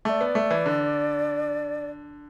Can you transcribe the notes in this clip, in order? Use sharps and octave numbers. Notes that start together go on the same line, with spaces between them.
A3 D5 E5
B3
A3
E3
D3